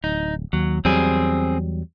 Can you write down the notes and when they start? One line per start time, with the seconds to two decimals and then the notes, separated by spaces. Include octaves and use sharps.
0.04 D1 D#4
0.53 D#2 F#3
0.85 E2 F#3 G3 C4 G#4